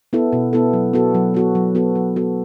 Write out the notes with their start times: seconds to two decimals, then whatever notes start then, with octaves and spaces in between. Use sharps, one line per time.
0.13 B3 E4 A4
0.33 B2
0.53 B3 E4 A4
0.73 F#3
0.93 B3 F#4 A4
1.14 F#3
1.34 B3 F#4 A4
1.55 F#3
1.75 B3 F#4 A4
1.95 F#3
2.16 B3 F#4 A4